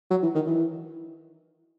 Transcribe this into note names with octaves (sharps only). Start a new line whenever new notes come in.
F#3
E3
D#3
E3